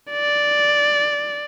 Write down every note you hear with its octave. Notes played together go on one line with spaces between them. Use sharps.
D5